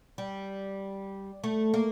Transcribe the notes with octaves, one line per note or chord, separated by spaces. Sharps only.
G3
A3
A#3